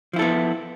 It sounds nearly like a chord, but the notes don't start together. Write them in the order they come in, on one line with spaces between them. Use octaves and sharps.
F3 E4 A4 B3